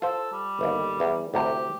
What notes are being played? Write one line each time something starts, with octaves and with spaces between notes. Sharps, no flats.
F4 A4 C5
G3
G1 D#2
E2
D2 A2 C3 G4